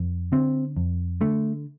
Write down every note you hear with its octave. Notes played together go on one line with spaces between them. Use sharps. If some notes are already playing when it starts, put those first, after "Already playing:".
Already playing: F2
D3 C4
F2
D3 A3